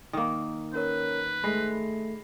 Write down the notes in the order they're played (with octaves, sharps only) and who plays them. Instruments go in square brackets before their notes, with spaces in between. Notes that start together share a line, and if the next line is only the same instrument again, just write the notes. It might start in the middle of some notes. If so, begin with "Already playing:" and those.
[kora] D#3 A#3
[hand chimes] C#4 A#4 C#5 [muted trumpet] B4
[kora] G#3 [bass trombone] A3 [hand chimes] B5 A#6 C7